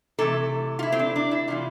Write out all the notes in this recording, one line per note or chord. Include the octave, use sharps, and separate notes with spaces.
C3 E3 A3 A4
F4
E4
C4
D4
D4
E4
C3 E3 G3 F4